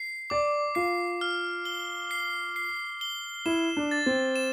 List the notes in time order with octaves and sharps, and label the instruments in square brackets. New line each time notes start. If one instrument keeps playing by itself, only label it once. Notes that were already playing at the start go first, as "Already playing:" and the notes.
Already playing: [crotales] C7
[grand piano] D5 [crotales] D6
[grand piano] F4 [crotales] C7
[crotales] F6
G7
C7
C7
G7
[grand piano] E4 [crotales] E7
[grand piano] D4
[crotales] A6
[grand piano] C4
[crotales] E7